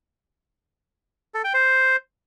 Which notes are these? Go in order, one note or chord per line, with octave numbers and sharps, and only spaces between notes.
A4
G5
C5